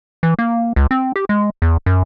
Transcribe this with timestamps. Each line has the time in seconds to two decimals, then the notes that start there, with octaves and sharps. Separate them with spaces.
0.23 E3
0.39 A#3
0.76 C#2
0.91 C4
1.16 G4
1.29 G#3
1.62 E2
1.86 F#2